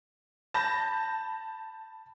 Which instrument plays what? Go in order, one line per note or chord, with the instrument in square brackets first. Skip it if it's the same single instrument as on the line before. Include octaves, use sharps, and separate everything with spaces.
[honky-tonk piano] A5 B5 G6 A#6